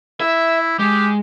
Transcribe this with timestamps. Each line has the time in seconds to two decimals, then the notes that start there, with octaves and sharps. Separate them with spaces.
0.21 E4 E5
0.79 G#3 G4